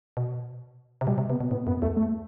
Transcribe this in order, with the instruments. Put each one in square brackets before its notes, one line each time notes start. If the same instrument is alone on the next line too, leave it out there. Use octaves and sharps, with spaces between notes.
[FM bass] B2
C3
[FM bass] B2 [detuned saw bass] G3
[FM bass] C3
[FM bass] C3 [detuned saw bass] B3
[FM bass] B2
[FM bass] A2 [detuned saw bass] B3
[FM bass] F#2 [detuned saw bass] B3
[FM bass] E2 [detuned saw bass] A3
[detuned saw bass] A3